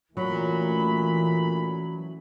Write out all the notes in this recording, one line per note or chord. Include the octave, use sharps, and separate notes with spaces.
A#2 E3 F#3 A3 C#4 B5